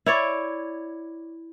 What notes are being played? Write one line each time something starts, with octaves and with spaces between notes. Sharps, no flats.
E4 C#5 D5